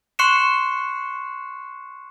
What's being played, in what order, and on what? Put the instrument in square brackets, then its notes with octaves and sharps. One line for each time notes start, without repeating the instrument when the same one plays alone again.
[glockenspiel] C6 C#6 F#6 C7 C#7 E7